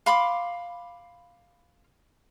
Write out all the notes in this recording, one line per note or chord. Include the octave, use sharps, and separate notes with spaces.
F5 B5 C6 D6